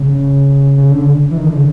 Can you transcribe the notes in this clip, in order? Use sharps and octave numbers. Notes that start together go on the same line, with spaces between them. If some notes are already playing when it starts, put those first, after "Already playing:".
Already playing: C#3
C#3
D3
E3
D#3
D3
C#3